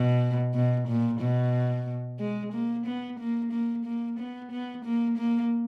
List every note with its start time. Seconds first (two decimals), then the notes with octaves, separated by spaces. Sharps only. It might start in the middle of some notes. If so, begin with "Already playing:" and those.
Already playing: B2
0.54 B2
0.87 A#2
1.20 B2
2.19 G#3
2.53 A#3
2.86 B3
3.19 A#3
3.52 A#3
3.85 A#3
4.19 B3
4.51 B3
4.84 A#3
5.17 A#3